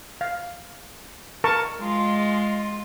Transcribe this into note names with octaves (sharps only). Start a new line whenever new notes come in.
F5
A#4 A5 C#6
G#3 F4